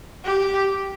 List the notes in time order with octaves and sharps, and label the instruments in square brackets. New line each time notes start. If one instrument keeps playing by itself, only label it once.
[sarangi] G4